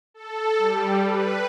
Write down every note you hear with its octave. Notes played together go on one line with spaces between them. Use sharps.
A4
G3
B4